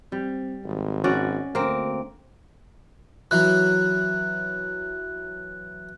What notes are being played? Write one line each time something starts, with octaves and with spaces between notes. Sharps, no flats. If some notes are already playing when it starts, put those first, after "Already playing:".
G3 C4
G#1
C#4 F#4 D5
D2 A#3 C4
E3 F#3 F#6